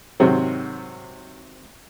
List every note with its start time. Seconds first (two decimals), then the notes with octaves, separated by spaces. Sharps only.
0.20 G#2 C3 D#3 F#3 C4